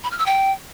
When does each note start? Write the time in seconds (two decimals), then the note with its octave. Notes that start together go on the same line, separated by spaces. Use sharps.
0.04 B5
0.11 F6
0.19 E6
0.26 G5